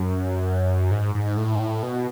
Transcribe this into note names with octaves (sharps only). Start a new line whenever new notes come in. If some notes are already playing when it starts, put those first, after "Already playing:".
Already playing: F#2
G#2
G#2
A2
G#2
A2
B2